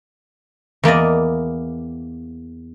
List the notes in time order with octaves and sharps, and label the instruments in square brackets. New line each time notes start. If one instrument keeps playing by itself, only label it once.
[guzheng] E2 A#3 D5 D#5